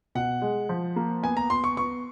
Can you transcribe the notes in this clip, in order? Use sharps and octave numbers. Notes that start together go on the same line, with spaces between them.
B2 F#5
G#3
F3
A#3
B3 G#5
A#5
B3 C6
C#6
B3 C#6